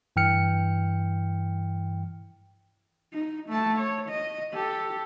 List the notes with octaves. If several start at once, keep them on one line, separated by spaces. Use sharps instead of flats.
G2 E3 G5 F6 C#7
D#4
A3 A5
C#5
D#5
G4 A4